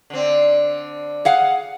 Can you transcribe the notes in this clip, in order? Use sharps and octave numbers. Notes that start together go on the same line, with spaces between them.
D3 C4
G#4 F5 F#5